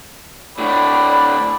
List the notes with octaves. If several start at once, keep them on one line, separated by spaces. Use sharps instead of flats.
A2 D3 D5 B5